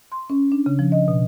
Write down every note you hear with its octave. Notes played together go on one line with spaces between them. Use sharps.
C6
C#4
D4
C#3
F3
D#5
B2